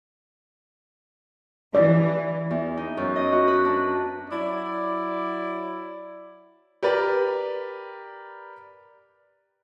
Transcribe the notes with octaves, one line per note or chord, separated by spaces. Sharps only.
E3 D5
E2
D#4
F#2
D#5
F#4
B4
D4
F#3 E4 D5
G4 A#4 B4 D5 G5